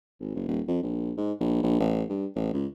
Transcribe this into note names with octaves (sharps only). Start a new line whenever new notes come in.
G#1
F#1
D#1
F2
A#1
G#2
A#1
A#1
A1
G2
A1
C#2